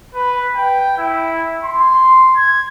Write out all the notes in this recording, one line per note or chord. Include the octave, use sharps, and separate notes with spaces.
B4
G5
E4
C6
G#6